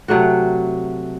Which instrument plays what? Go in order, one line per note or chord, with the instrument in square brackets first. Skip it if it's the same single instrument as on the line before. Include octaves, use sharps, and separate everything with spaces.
[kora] C3 F#3 A3 F#4